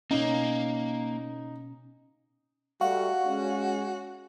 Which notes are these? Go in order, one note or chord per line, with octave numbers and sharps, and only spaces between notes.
B2 A#3 C#4 D#4
G3 A3 F#4 F5 F#5 C#6
G#3 C#4